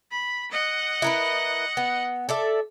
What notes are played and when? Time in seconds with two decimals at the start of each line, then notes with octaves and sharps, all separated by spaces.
0.11 B5
0.51 D#5 F#5
1.02 E4 A#4 B4
1.77 B3
2.29 A4 D5 E5